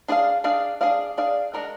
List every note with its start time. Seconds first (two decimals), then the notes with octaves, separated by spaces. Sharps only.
0.08 D4 G#4 D5 F5
0.44 D4 G#4 D5 F5
0.81 D4 G#4 D5 F5
1.18 D4 G#4 D5 F5
1.53 G#3 D4 F#4 A#4 D5